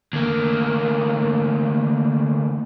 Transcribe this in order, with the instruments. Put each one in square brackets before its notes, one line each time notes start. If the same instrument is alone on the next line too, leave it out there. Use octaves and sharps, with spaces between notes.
[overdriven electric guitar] D2 A#3